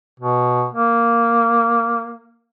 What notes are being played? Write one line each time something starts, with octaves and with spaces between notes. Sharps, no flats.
B2
A#3